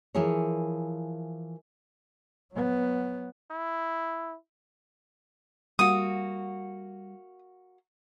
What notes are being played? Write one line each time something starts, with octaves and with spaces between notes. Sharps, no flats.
E3 F3 E4 G#4 A#4 C#5
F#3 B3
E4
G3 A#3 F#4 D#6